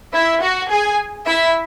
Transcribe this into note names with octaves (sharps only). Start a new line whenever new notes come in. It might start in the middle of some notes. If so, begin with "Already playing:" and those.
E4 E5
F#4 F#5
G#4 G#5
E4 E5